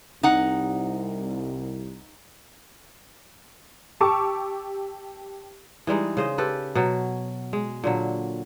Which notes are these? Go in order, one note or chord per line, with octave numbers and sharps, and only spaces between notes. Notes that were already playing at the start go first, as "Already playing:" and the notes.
C2 D#4 F#5
G4 A5 C#6 D6 E6
E3 G3 G#3 D#4
C#3 C5 D#5
G4 A4 B4
B2 F#3
G#3
A#2 D3 F#3